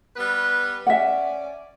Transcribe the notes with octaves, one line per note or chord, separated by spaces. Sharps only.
G3 B3 B4
C#4 D5 E5 F#5